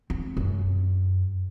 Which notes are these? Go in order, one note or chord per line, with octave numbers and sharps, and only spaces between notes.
C4
F#2